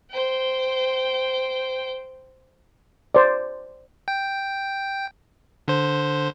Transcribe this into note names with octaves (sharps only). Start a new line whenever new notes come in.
C5 G5
C5 D5
G5
D3 C5